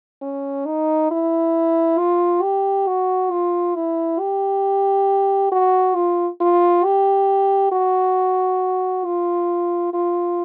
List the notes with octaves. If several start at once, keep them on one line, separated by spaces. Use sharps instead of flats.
C#4
D#4
E4
F4
G4
F#4
F4
E4
G4
F#4
F4
F4
G4
F#4
F4
F4